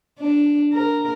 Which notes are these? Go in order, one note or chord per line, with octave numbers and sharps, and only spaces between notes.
D4
A#4